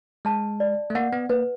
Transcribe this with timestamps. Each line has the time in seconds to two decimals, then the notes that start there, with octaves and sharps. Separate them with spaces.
0.25 G#3 A5
0.60 D5
0.90 A3
0.95 A#3 F#5
1.13 B3
1.29 A#3 B4